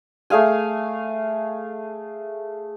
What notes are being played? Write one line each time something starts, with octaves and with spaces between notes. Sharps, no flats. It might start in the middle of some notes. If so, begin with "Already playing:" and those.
A3 G#4 F5 G#5